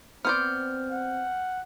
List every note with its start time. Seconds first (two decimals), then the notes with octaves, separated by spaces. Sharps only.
0.25 B3 C4 C5 D5 F6 G6
0.92 F#5